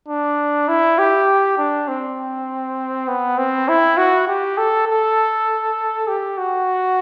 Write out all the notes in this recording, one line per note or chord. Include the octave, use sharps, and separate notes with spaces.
D4
E4
G4
D4
C4
B3
C4
E4
F#4
G4
A4
A4
G4
F#4